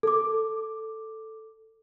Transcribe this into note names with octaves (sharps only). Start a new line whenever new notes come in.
A4 D6